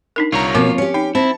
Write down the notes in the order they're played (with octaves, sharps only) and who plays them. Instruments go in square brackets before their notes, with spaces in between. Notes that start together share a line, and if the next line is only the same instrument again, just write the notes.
[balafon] D4 D#4 A#4
[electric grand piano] C2 A#5 [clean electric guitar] F4 C#5
[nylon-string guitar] B2 [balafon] F3 C4 A#4 [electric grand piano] A#3
[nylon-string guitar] C#4 G4 [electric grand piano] C#7
[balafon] D#4 [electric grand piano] G5
[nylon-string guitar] C4 [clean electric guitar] E4 [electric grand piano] A5